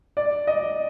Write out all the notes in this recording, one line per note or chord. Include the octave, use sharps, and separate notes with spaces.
D5
D#5